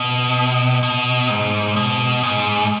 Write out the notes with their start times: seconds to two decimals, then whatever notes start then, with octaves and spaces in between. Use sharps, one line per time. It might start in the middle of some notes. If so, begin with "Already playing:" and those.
Already playing: B2
0.83 B2
1.30 G#2
1.76 B2
2.23 G#2